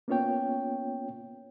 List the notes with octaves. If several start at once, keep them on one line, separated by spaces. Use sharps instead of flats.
A#3 B3 C#4 F4 C#5 G5